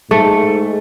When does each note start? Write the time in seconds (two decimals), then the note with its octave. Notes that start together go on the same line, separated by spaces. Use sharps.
0.11 G#2 A3